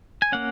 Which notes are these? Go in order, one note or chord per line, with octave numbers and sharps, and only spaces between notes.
G#5
A#3 C#4 F#5